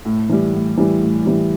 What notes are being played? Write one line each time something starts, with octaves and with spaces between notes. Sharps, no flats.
A2
E3 G3
A2
E3 G3
A2
E3 G3